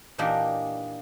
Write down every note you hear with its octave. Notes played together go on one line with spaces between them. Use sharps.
A#2 E3 A#3 D4 D#4 G4